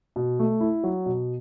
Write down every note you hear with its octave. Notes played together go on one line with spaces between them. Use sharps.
B2
A3
E4
F#3
B2